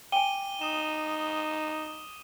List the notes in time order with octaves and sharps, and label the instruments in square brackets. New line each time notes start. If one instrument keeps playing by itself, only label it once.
[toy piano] G5 G#5 [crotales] D6 D#7 G7
[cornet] D#4 [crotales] D#6 E7